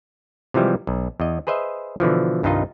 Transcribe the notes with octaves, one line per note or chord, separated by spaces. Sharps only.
C3 E3 F3 G3 G#3
B1
E2 D#5
G#4 B4 C5 D#5 E5
B2 D3 E3 F3
C2 G2 D#3 D#4 F4 D#5